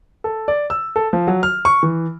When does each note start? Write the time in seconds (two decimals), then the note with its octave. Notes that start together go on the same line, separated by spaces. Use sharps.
0.24 A4
0.48 D5
0.70 E6
0.96 A4
1.13 F3
1.27 F#3
1.43 F6
1.65 C#6
1.83 E3